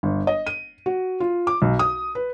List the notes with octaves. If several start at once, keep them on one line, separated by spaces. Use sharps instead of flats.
G1
D#5
D#7
F#4
F4
D6
B1
D#6
B4